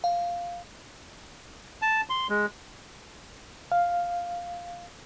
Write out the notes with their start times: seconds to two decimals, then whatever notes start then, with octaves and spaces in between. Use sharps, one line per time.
0.04 F5
1.82 A5
2.09 C6
2.30 G#3
3.72 F5